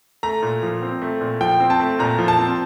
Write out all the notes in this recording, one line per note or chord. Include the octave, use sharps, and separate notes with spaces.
A3 A#5
A#2
F3
C4
A3
A#2
F3 G5
C4
A5
A3
A#2 A#5
F3
A5
C4